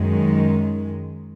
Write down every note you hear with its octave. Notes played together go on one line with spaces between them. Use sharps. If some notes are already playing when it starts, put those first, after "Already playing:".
Already playing: F#2 D#3 G#3